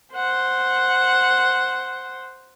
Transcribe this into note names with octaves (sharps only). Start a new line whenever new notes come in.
C5 F#5